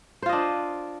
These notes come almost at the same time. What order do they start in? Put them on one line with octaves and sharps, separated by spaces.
C5 F4 D#5 D4